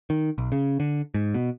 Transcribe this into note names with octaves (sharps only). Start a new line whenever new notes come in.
D#3
B1
C#3
D3
G#2
B2